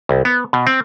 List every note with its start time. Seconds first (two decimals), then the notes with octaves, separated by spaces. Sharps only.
0.09 C2
0.25 B3
0.53 B2
0.67 C4